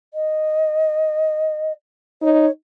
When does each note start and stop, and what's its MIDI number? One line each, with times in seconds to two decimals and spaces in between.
0.14 1.72 75
2.22 2.47 63
2.22 2.50 73